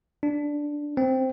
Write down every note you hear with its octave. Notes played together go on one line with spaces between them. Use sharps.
D4
C4